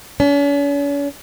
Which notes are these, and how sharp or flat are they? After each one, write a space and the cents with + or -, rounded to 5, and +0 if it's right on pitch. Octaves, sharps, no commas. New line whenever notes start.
C#4 +45